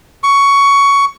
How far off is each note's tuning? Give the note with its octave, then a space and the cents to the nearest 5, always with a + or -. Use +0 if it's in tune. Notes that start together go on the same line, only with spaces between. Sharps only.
C#6 +15